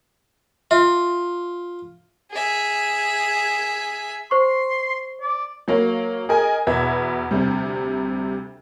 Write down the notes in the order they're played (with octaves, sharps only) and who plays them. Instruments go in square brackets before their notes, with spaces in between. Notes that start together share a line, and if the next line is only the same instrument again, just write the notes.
[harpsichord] F4 [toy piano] E5
[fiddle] G#4 E5
[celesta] C5 C#6 [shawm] C6
[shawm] D5
[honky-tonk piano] F#3 A#3 C#5 F5
G#4 A#4 D#5 G#5
E2 B2 B4 E5 G#6
D2 C3 G3